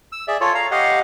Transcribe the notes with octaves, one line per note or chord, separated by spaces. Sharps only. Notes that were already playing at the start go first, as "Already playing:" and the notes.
E6
G#4 D5 E5
F4 A4 C#5
F5 A#5
G4 D#5 F5 F#5